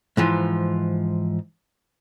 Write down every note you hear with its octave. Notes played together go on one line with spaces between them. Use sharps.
G#2 E3 F3